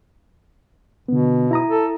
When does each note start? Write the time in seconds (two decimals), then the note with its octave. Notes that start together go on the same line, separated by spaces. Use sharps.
1.08 B2 D3 B3
1.51 E4 A#5 D#6
1.70 A4